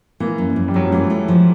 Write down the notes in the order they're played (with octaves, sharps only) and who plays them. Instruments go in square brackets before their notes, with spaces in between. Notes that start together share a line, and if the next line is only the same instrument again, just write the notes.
[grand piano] E3 [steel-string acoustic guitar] A#3
[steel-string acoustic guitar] F#2
F#2
[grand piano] G3
[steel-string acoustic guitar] F#2 [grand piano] F#3
[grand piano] F3
[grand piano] E3 [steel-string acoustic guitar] A3
[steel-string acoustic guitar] A3
F3